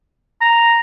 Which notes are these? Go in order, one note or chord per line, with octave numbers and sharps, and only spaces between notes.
A#5